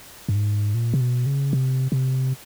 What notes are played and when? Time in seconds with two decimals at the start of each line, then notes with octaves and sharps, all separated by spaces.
0.29 G2
0.35 G#2
0.74 A#2
0.94 C3
1.01 B2
1.26 C#3
1.53 C3
1.92 C3